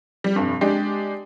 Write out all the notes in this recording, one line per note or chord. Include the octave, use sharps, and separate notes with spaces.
G3
F1 G2
G#3 D4 G4 D5